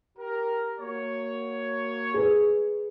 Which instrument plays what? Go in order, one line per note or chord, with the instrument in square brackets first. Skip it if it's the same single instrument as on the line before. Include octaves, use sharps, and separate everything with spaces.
[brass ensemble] G4 A#4
A#3 F#4 C#5
[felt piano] G#4 B4